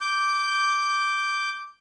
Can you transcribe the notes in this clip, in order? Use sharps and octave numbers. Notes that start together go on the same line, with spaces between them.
D6 G6